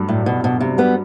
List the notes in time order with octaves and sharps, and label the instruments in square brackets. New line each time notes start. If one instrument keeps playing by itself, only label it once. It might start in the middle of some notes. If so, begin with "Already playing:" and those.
Already playing: [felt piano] G2 F#3 A3
[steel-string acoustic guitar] A2
B2
B2
C3
G3 B3